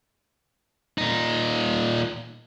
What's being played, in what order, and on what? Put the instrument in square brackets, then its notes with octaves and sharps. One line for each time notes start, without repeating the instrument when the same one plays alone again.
[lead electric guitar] A#2 D#4